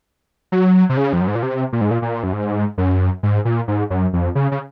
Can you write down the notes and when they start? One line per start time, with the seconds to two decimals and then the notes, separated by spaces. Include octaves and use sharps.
0.52 F#3
0.89 C3
0.97 C#3
1.13 F2
1.21 F#2
1.28 G#2
1.35 A#2
1.43 C3
1.73 A#2
1.81 G#2
1.91 A#2
2.02 A#2
2.23 F#2
2.33 G#2
2.78 F#2
3.23 G#2
3.45 A#2
3.68 G#2
3.90 F#2
4.13 F2
4.35 C#3
4.52 C#3